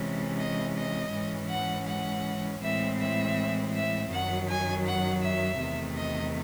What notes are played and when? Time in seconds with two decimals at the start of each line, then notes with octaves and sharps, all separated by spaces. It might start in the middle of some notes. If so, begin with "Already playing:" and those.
Already playing: C3 E3 G#3 C#4
0.37 D#5
0.75 D#5
1.12 G#2 E3 G#3 C#4
1.49 F#5
1.86 F#5
2.61 A2 E3 G#3 C4 E5
2.98 E5
3.73 E5
4.10 F#2 D#3 F#3 F#5
4.47 G#5
4.84 F#5
5.21 E5
5.58 E2 C3 D#3 A3
5.96 D#5